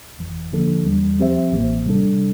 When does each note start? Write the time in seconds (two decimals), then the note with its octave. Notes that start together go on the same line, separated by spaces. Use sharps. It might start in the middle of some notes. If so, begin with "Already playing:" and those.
0.19 G1 F2 E3
0.52 D3 F3 A#3 D4 A4
0.85 E2 E3 G3
1.19 F3 C4 G4 C5 E5
1.52 A1 A2 E3 A#3
1.86 C3 G3 D4 A4